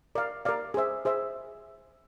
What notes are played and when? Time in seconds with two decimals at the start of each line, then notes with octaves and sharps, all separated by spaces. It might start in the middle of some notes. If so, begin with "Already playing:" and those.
0.15 A#4 D5 F5
0.45 A#4 D5 F5
0.74 G#4 C5 E5
1.05 G#4 C5 E5